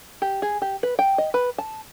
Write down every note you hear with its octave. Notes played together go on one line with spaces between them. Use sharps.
G4
G#4
G4
B4
G5
D#5
B4
A5